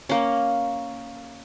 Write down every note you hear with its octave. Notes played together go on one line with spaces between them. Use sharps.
A#3 C#4